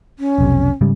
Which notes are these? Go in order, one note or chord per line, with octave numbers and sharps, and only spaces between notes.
C#4
F1 B1 C3
G#2 C#3 G3